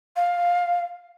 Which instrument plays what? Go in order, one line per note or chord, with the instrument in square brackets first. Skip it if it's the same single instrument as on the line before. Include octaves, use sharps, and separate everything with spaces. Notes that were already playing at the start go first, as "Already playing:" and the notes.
[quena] F5